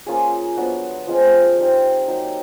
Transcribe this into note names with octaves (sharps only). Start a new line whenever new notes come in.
A#3 C#4 F4 G#4
F#3 B3 D4 F#4
F3 G#3 C4 F4
G3 C4 D#4
F#3 A#3 D#4 G4